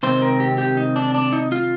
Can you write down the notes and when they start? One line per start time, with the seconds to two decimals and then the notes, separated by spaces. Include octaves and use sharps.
0.03 C3 D#3 G#3 C4 C5
0.22 A#4
0.40 G4
0.58 G4
0.77 D#4
0.96 D4
1.15 D4
1.33 D#4
1.52 F4